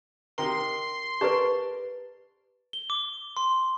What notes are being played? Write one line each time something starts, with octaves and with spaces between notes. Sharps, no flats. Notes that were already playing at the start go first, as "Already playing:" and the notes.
C3 D#3 A#4 C6
G4 A#4 B4 D5 A5
G7
D6
C6